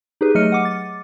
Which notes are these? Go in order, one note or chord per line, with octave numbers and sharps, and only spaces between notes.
D#4 G4 G#4 B4
F#3 A3 D#5 F6 C#7 D#7
F#5 D6
A6